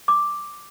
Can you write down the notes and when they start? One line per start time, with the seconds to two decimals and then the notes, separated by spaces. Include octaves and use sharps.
0.08 D6